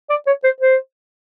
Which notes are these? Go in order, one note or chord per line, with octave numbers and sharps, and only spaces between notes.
D5
C#5
C5
C5